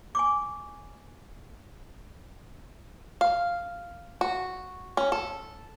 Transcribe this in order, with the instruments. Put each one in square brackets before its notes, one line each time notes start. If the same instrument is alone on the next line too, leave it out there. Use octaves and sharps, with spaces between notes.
[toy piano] G#5 C#6 D6
[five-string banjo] F5
F#4
C#4
A4